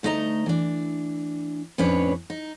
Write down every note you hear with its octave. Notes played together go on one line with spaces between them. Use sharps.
D2 A3 D#4 D#5 A#5
E3 D4
F2 A2 C#4 D4 B4 C#5
D#4